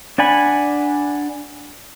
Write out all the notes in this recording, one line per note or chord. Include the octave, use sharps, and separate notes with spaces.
D4 D5 F#5 G#5 B5